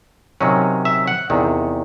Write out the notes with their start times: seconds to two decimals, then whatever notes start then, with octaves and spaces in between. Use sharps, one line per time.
0.41 C3 D#3 F#3 C#4
0.85 E5
1.08 F#5
1.30 E2 C3 D#3